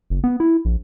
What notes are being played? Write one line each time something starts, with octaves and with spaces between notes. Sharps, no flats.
F#1
B3
E4
A#1